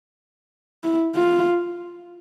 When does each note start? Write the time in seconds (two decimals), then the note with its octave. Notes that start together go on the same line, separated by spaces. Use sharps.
0.83 E4
1.16 F4